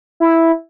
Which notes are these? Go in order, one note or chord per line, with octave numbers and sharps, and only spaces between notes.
E4